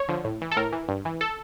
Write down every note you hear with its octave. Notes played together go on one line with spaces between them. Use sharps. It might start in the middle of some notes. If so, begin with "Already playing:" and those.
Already playing: C#5
D3 F3
A2
E3
A4
A2 A#4
E3
G2
E3
A4